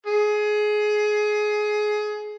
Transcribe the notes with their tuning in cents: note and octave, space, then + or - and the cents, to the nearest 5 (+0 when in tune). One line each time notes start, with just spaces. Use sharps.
G#4 +20